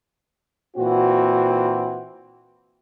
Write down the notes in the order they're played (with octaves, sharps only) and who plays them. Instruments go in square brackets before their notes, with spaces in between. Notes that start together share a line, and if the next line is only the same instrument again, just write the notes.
[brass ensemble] A#2 E3 C4 F#4